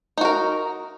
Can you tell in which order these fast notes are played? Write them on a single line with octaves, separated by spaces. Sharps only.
D#4 F#4 A#4